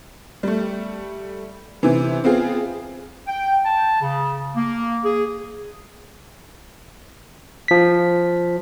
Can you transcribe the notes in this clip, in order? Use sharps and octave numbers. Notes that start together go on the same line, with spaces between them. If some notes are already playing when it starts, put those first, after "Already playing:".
G3 A3
C3 E3
B3 C4 F4 G#4
G5
A5
C#3
A#3
G#4
F3 B6